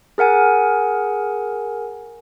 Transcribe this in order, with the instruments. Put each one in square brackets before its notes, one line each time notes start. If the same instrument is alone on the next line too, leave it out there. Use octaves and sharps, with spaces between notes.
[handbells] G#4 A#4 F#5 G#5